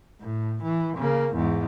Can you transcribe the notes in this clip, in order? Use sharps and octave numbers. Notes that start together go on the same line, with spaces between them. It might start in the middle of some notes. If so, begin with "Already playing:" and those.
A2
E3
C#3 A#3
E2 G#2